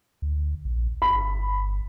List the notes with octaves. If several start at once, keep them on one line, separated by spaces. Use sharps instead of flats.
D2
A#1
G1 B5